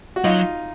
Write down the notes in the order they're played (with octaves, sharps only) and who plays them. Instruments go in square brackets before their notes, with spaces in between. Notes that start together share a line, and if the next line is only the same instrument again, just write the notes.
[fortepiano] F#4
[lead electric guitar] F#3 [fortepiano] D#4 F4